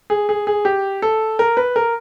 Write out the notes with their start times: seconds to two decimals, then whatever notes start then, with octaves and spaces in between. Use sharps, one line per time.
0.10 G#4
0.29 G#4
0.47 G#4
0.65 G4
1.02 A4
1.39 A#4
1.57 B4
1.76 A#4